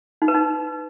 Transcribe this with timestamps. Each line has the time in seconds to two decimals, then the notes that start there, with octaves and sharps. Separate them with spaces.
0.22 D#4
0.28 B4
0.34 D#4